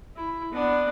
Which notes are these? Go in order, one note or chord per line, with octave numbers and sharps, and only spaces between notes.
E4
B3 D4